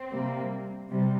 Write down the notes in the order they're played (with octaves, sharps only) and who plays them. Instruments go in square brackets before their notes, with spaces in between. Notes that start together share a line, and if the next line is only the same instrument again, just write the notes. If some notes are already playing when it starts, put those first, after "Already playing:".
Already playing: [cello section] C4
C3 G3 A#3
C3 G3